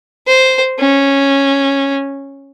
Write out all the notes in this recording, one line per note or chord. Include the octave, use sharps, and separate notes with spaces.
C5
C#4